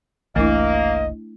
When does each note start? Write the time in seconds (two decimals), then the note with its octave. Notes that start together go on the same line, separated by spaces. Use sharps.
0.36 F#1 C2 E3 A3 A#3 D4 E4 D#5